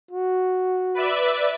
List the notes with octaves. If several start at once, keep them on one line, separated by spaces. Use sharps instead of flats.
F#4
B4 D5 E5